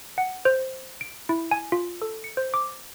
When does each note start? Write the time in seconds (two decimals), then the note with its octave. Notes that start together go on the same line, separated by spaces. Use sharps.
0.18 F#5
0.45 C5
1.01 D7
1.29 E4
1.51 G#5
1.72 F4
2.02 A4
2.24 C#7
2.37 C5
2.54 D6